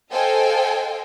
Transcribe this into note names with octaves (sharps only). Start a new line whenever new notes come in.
A4 C5 D#5 F5 G5 G#5